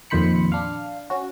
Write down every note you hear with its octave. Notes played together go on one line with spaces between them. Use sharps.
F2 A#2 D#3 C5 B5 C#7
D4 F5
C#4 F#4